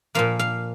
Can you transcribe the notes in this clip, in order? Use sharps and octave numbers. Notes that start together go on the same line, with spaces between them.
A#2 F3 A#3 F5
F5